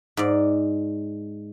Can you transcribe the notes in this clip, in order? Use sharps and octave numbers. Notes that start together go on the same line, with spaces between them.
G#2 D5